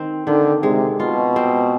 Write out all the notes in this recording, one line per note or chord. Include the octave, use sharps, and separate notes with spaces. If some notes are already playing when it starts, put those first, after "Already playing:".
Already playing: D#3 C4
D3 D#3
C3 G#3
B2 F4
C4